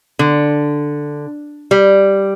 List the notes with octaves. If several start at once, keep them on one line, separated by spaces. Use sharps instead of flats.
D3
G3